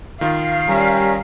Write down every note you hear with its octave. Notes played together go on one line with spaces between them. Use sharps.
D#3 F4 F5
G3 C#4 A#4 B6